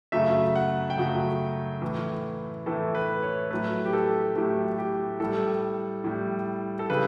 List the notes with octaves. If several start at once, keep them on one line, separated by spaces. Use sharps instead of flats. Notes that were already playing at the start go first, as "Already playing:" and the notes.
F#2 C#3 F#3 A3 E5
F#5
G5
F#2 C#3 F#3 A3 F#5
A2 E3 A3
A2 E3 A3 A4
B4
C#5
A2 F#3 A3 B4
G4
A4
A2 F#3 A3 G4
G4
A2 G3 A4
A2 G3
A4
C#3 G3 B4